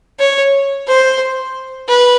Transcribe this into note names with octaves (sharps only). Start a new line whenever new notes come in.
C#5
C5
B4